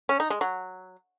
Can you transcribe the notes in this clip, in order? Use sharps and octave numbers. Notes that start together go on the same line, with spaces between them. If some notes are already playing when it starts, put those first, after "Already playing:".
C#4
D#4
G#3
F#3